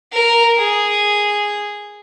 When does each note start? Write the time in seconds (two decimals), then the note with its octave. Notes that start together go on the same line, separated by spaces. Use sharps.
0.12 A#4
0.57 G#4